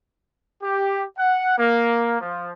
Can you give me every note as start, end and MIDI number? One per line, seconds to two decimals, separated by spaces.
0.62 1.03 67
1.18 1.54 78
1.58 2.16 58
2.21 2.52 53